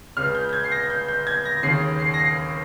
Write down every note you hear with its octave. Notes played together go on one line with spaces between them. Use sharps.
C#2 C#3 F6
G6
G6
G#6
C7
A#6
G6
G6
G#6
A#6
D#2 C#3 C7
C7
A#6
C7